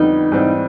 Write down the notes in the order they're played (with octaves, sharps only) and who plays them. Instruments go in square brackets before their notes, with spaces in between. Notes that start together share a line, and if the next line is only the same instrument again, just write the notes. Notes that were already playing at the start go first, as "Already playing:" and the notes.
Already playing: [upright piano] F2 D3 G3 B3 [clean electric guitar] D#4
[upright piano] G#2 E3 G3 C4